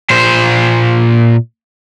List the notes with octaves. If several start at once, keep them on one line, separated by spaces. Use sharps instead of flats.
A#2 C5